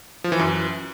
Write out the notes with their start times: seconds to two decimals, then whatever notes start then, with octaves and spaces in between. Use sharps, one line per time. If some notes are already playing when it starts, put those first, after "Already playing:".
0.24 F3
0.32 E3
0.39 F#2